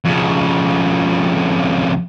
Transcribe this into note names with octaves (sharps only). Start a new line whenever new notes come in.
F2 C#3